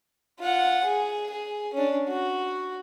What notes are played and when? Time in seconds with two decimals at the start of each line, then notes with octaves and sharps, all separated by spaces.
0.40 F4 F#5
0.84 G#4
1.31 G#4
1.73 C#4 D4
2.09 F#4